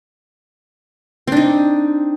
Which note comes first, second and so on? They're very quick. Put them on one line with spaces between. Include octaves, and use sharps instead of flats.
C4 D4 D#4